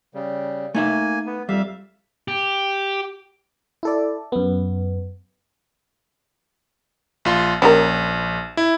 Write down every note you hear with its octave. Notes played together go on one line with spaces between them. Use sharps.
C#3 G3
A3 A#3 D#4 E5 G#5
B3
F2 G3 E5 F5
G4
E4 A4 D5
F#2 B3
A#1 F4 C6
A#1 C#4 G4 A#4
E4